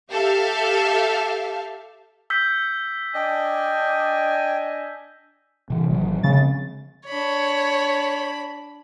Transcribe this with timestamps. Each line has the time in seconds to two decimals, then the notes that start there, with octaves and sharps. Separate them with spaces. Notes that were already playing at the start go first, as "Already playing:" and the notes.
0.11 G4 A4 E5 F5
2.30 E6 G6 B6
3.15 D4 D#5 G5 G#5
5.70 C3 E3
5.90 A1 D#3 F#3
6.23 C#3 F3 G#3 C4 A6
7.09 D4 C#5 B5